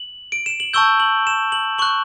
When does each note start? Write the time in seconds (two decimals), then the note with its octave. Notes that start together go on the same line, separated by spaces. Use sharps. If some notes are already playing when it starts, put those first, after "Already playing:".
Already playing: F#7
0.32 D7
0.46 E7
0.60 F#7
0.73 A5 C#6 E6 G6 G7
1.00 F#7
1.27 E7
1.52 F#7
1.78 C#6 F#6 F#7